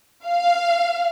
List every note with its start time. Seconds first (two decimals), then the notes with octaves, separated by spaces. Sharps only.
0.25 F5